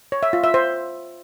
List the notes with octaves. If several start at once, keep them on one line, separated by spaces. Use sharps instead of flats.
C#5
E5
F4
E5
C5